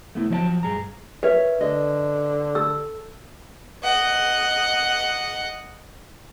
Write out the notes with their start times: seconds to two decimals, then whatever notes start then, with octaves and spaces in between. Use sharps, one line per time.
0.15 A3 B3 E4
0.30 F3 F#3 C5 D#5 G5 A5
0.63 G2 G#4 A#5
1.23 A#4 B4 C#5 E5
1.61 D3 D#5
2.55 A4 E6
3.84 D#5 F#5